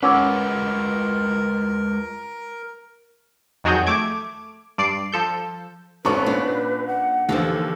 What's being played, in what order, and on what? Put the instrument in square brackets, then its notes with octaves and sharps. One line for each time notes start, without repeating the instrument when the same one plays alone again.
[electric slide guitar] G#3 F4 B4 [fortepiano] C#4 [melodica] A#4 [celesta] F#5 D6 E6
[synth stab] F2 D#3 F#3 F#4 G#4 G6
A3 D6 G#6
G2 D5 C7
F3 A4 G6
[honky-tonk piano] G#1 A4 C#6 [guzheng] C#4 F#4 [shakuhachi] B4
[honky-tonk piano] A#2 [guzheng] D4
[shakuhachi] F#5
[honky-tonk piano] D#2 [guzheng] D3 E3 F3 [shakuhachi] A4